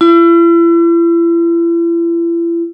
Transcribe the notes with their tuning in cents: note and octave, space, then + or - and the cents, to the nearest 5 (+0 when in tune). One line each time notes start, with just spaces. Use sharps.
E4 +40